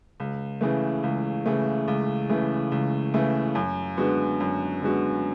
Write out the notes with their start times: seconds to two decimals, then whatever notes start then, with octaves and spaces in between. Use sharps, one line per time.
0.20 C#2
0.61 C#3 E3 A3
1.03 C#2
1.46 C#3 E3 A3
1.88 C#2
2.29 C#3 E3 A3
2.72 C#2
3.14 C#3 E3 A3
3.55 F#2
3.97 D3 G#3 B3 F#4
4.40 F#2
4.82 D3 G#3 B3 F#4